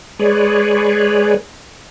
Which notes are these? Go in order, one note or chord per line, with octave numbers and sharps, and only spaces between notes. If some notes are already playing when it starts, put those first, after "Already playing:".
G#3 G#4 B4 C#5 D5